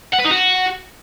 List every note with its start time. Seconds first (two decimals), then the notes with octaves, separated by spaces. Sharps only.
0.13 F#5
0.19 B4
0.24 D#4
0.30 F#4